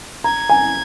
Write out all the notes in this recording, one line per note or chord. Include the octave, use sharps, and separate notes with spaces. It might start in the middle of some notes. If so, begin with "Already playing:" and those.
A#5 G#6
G#5